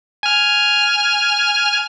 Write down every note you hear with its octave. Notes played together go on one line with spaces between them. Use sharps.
G#5 F6